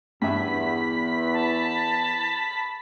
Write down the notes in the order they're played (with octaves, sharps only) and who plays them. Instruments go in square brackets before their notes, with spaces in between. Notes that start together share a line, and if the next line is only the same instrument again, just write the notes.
[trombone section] E2 [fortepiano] G2 E5 [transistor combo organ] B5
[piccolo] A5